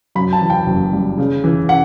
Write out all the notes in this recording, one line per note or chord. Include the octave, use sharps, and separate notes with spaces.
F#2 B5
A5
E3
G5
F#1
G3
C#3
E3
F#5